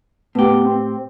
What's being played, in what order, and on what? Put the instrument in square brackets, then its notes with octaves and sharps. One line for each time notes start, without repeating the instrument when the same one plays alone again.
[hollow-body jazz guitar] A2 G4 [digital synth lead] B3
[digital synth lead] C4